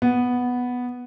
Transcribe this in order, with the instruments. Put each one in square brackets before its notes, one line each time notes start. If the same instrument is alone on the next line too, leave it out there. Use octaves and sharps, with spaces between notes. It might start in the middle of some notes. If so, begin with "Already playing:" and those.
[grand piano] B3